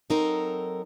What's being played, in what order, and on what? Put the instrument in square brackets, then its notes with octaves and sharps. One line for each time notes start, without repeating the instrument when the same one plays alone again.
[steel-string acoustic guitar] F#3 C4 D#4 A4 A#4